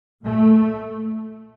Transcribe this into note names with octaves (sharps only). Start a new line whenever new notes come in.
A#2 A3